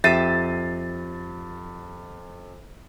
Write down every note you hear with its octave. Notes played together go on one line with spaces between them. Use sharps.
F2 G4 E5 A6 C7 D#7